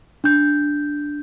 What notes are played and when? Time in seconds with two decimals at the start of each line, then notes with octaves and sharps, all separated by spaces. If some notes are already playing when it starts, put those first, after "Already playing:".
0.24 D4 G6